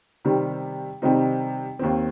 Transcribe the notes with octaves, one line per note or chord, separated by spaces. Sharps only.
C3 D#3 G3 C4
C3 D#3 G3 C4 D#4
D#2 D#3 C4